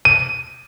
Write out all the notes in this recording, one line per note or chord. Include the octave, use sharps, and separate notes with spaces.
D#7